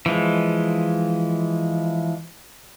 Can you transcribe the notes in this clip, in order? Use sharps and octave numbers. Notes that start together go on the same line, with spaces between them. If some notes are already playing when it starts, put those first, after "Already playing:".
E3 F3 G#3